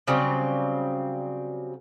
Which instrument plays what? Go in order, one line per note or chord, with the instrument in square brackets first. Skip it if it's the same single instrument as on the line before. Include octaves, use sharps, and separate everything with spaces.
[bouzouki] C#3 F#3 G3 C4